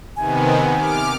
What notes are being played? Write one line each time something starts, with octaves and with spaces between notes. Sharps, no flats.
C3 D#3 B3 G#5
D6 F6